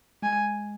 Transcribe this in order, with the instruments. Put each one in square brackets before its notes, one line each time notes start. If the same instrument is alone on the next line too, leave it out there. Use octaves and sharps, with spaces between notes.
[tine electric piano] G#3 [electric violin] G#5